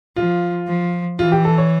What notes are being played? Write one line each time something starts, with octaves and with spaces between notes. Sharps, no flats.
F3 F4
F3
E3 F4
G4
A4
C#5